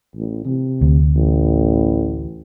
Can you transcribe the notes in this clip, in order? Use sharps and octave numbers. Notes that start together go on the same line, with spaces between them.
A1
C3
D2
A1